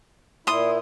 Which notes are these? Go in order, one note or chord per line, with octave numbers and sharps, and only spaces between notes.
A#2 E4 C6 D#6